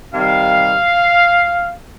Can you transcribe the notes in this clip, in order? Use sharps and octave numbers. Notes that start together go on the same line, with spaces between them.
C3 D#3 G3 F5